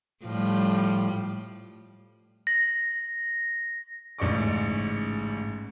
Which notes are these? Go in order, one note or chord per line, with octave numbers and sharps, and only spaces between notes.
A2 F3 G3
A#6
A1 G#2 C#3 D5 C#6 D6